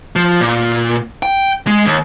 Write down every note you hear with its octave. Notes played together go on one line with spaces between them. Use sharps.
F3
A#2
G5
G#3
D#2